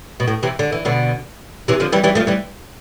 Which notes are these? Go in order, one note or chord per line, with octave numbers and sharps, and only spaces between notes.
B2
A2
C3 E3
D3
E3
B2 D3
C3 E3
D3 F3
E3 G3
E3 G3
F3 A3
E3 G3